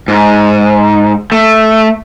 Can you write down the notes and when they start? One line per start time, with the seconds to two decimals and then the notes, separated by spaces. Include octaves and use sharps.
0.08 G#2
1.32 A3